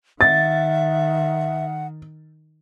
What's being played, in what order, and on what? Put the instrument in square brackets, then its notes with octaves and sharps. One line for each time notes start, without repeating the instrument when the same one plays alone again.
[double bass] D#3 [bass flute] E5 [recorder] F#5 [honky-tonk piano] A6